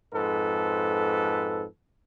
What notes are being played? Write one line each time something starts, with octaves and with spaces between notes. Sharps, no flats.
F2 G#2 A4 B4